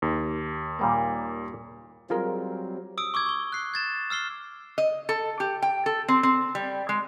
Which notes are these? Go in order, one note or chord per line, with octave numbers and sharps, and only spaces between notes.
D#2
A#2 G3 A#3
F#3 G3 C4 F4 G#4 A#4
D#6 E6 D7
C#6 D6 E6 G#6
C#6 G7
F#6 C7
G#6 A6 E7
E6 F6 C7 G7
D#5
A4
G4
G5
A4
C4
C4
G3
G#3